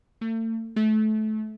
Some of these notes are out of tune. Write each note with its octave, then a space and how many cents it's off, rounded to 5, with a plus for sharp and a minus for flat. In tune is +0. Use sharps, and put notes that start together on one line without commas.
A3 +40
A3 -25